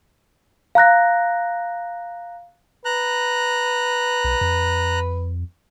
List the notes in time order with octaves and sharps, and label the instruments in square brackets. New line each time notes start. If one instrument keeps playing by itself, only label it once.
[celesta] F5 A#5 F#6 A#6
[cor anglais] B4 [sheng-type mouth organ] A#5 F#6
[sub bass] B1
F2